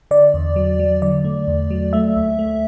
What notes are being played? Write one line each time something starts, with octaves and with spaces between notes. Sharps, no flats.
D3 D5
E2
F#3
F#3
D3 D5
A3
E2
F#3
A3 E5
D2
A3